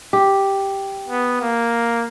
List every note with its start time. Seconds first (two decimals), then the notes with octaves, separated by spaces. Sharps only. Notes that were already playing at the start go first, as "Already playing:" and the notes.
0.13 G4
1.08 B3
1.41 A#3